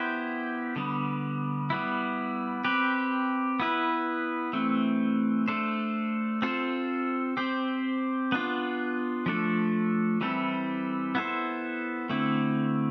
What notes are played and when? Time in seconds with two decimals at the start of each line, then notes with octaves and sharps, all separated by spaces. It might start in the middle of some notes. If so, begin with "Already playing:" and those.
Already playing: B3 E4 G4 C5
0.76 D3 G3 B3
1.70 G3 B3 E4
2.64 C4 G4 B4
3.60 B3 E4 B4
4.53 E3 A3 C4
5.48 A3 D4 A4 C5
6.42 C4 F4 A4 C5
7.37 C4 G4 C5
8.32 B3 D4 F4
9.26 F3 A3 D4 A4
10.21 E3 G3 C4 E4 A4
11.15 B3 E4 A4 C5
12.09 D3 A3 C4 E4